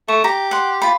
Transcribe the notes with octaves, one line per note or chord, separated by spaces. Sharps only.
A3 C#6
G4 A#5
F#5 C6
F4 B5